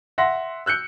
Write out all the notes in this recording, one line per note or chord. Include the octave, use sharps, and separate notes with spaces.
E5 F#5 C6 A#6
E6 F#6 G6 C#7